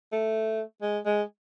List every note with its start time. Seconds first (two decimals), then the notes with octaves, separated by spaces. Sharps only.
0.12 A3
0.82 G#3
1.05 G#3